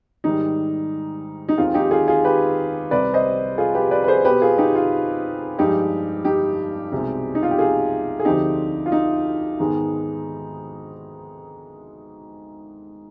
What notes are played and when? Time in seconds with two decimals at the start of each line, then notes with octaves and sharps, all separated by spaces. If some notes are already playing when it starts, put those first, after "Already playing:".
0.24 G#2 D#3 G3 D#4
1.49 D#4
1.58 D#2 D#3 G#3 C4 F4
1.74 D#4 G4
1.91 F4 G#4
2.08 F4 G#4
2.25 G4 B4
2.91 C2 C3 G3 C4 B4 D5
3.13 C5 D#5
3.58 F4 G#4
3.75 G4 B4
3.91 B4 D5
4.04 B4
4.08 G#4 C5
4.25 B2 B3 G4 B4
4.42 F4 G#4
4.58 D#4 G4
4.75 F4
5.58 G2 F3 G#3 D#4 G4
6.25 D#4 G4
6.92 C2 B2 G#3 C4
7.35 D#4
7.43 F4
7.51 G4
7.58 F4 G#4
8.20 G#4
8.25 D2 D3 F3 C4 D#4 G4
8.86 F4
8.92 D#4
9.59 G#2 D#3 G#3 B3